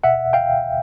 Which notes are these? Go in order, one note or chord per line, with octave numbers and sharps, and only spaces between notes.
B2 E5 F#5
F5 G5